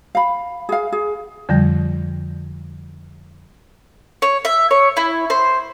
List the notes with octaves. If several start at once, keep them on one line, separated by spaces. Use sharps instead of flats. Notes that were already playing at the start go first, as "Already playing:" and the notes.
F5 B5
G#4 F5
G#4
F2 D3 F3 G3 G6 A#6
C#5
E5
C#5
E4
C5